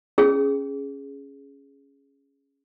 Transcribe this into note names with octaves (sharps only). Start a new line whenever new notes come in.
C#4 G#4